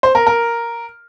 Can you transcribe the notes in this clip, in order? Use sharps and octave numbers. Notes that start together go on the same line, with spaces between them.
C5
A#4
A#4